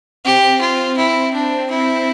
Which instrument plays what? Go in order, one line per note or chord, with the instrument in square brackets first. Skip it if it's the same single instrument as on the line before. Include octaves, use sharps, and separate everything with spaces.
[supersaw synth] C4 [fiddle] G4
[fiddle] F4
E4
D4
E4